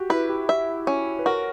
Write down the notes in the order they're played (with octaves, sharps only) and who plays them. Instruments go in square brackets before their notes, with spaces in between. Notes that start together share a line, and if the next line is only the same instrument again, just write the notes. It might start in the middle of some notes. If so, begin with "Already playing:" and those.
Already playing: [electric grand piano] F#4 G4
[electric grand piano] E4 [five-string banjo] B4
[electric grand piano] G4
[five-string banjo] E5
C#4
[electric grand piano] B4
[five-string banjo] F#4 [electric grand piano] A#4